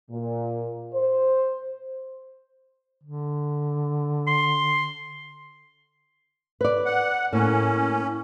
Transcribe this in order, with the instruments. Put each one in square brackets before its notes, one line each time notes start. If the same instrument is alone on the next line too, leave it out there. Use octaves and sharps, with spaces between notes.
[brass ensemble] A#2
C5
[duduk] D3
[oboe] C6
[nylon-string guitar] B4 D5
[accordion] F#5
[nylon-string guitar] A2 A#3 [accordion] C#4